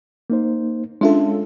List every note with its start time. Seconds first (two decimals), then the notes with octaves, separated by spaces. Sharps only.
0.30 A#3 D#4 C5
1.01 G#3 C#4 D4 F4 A4 E5